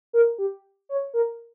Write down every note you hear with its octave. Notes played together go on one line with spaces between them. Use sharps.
A#4
G4
C#5
A#4